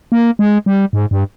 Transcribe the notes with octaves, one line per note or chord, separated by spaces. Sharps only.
A#3
G#3
G3
G#2
G2